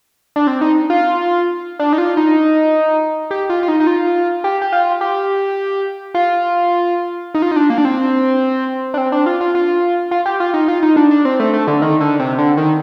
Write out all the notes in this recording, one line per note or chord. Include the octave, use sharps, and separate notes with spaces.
D4
C4
D#4
F4
D4
D#4
F4
D#4
G4
F4
F4
D#4
D#4
F4
G4
G4
F4
G4
F4
D#4
F4
D#4
D4
A#3
D4
C4
D4
C4
D4
F4
F4
F4
F4
G4
F4
D#4
F4
D#4
D4
D4
C4
A3
A3
D3
D#3
D3
C3
D3
D#3